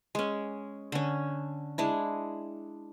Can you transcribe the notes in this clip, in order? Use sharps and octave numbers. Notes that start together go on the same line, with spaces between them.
G#3 C#4
D3 C#4
G#3 D4 E4